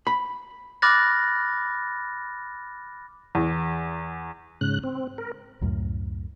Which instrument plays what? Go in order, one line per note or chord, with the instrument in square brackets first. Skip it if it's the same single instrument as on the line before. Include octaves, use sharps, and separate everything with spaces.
[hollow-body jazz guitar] B5
[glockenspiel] B5 D6 F6 F#6 A6 A#6
[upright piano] E2
[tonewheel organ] G#2 C#3 F#6
C4
A#4
[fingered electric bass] C#2 F#2 A2